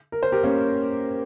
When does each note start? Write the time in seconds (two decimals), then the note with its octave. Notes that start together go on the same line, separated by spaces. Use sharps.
0.12 A#4
0.23 C5
0.32 G4 A#4
0.43 A#3 C#4